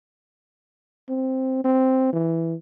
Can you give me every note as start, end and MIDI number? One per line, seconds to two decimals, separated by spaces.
1.09 1.63 60
1.64 2.10 60
2.13 2.54 52